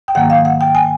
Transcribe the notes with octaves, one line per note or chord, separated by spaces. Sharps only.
G5
G#2 D#3 F#3 A#3 F#5
F5
F#5
G5
G#5